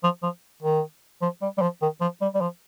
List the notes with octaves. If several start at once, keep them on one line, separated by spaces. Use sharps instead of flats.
F3
F3
D#3
F3
G3
G3
F3
D#3
F3
G3
G3
F3